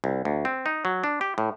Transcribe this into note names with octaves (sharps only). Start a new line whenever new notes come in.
C2
D2
C4
D#4
F#3
D4
G4
A2